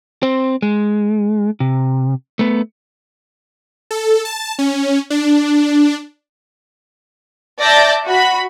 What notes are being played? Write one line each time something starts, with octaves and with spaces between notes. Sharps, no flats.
C4 C5
G#3
C3
A3 B3
A4
A5
C#4
D4
D5 E5 A5 G6 A6 A#6
F#4 B5